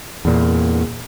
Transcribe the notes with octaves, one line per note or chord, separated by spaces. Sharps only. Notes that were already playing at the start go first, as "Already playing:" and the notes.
E2 A#2